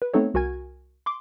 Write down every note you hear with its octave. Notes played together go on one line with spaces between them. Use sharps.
B4
A3 B3 C4 D#4 A4 C#5
C2 F#4 A#4 G#5 G#6
C6 D6